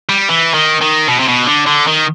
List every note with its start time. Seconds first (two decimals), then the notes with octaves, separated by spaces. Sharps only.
0.09 G3
0.29 E3
0.54 D#3
0.81 D#3
1.08 B2
1.19 C3
1.28 B2
1.47 D3
1.67 D3
1.87 D#3